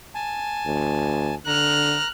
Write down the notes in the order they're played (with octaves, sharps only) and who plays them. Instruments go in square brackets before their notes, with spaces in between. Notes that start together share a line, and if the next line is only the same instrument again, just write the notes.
[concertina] G#5 A5
[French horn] D2
[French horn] D3 [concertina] A#5 [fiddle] F6 F#6